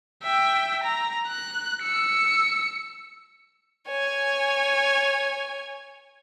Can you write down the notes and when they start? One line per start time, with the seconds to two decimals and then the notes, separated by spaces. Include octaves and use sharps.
0.23 E5 G5
0.83 A#5
1.27 F#6
1.82 E6 C#7
3.87 C#5 G#5